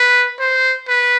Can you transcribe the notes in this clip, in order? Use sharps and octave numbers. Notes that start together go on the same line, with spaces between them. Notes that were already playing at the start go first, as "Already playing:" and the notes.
Already playing: B4
C5
B4